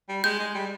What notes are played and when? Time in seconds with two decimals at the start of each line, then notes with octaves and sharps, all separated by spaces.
0.09 G3
0.24 G#3 G6
0.39 G#3
0.55 G3